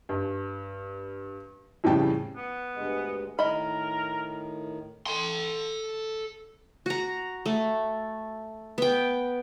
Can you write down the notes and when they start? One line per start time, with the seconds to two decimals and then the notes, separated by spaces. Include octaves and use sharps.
0.09 G2
1.84 F2 A2 C#3 G3 G5 A5
2.37 B3
2.75 D2 G2 G#3
3.39 A2 D#3 A#4 D#5 B5
5.07 A4 C6
6.86 F#4 A#5
7.46 A3
8.78 B3 G5